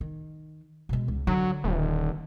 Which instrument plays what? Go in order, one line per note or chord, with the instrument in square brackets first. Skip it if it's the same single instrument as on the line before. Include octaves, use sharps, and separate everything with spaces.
[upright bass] D#3
B2 G#3
C#2
[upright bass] D3 [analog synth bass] F#3
[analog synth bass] D#1